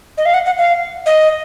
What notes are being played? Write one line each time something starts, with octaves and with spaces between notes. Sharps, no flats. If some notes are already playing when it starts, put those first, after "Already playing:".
D#5
F5
F#5
F#5
F5
D#5